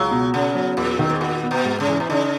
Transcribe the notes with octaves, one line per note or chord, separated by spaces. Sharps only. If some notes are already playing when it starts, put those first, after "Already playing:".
Already playing: C#2 F#3
B2
C#3 B3
F#3
E2 A#2
D#3
G#2
A#2 F#4
B3
B2
G#2
C#3
E3
B2
C#3 D#4